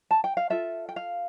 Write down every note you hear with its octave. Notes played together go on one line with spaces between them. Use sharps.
A5
G5
F5
F4 A4 E5
G5
F5